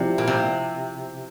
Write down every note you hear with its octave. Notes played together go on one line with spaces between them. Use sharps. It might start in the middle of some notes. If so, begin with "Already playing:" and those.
Already playing: C3 F3 C4 E4 G4 D5
A#2
C3